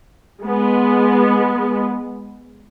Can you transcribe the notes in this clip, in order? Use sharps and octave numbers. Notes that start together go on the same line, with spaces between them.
G#3 B3